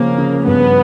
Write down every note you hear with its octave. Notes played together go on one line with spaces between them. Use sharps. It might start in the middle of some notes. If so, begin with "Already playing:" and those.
Already playing: C#3 F3 A#3 C#4
C#3
G2 B3